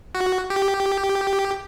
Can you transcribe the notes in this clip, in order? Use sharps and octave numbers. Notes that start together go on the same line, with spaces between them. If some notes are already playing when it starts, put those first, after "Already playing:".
F#4
G4